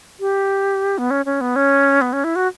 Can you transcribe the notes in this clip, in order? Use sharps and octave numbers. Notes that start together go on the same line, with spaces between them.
G4
B3
C#4
C#4
B3
C#4
B3
C#4
E4
F#4